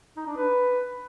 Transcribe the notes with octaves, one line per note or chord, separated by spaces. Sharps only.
D#4
D4
B4